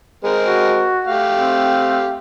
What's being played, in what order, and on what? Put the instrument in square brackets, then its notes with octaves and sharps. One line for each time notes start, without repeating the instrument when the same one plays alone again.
[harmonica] G#3 C4 A#4
[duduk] F#4
[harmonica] A3 G4 F5
[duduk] C4